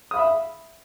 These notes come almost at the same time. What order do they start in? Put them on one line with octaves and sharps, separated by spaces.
D#6 F5 B5 E5